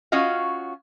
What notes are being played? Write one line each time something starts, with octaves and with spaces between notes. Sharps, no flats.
C#4 F4 F#4 D#5 F5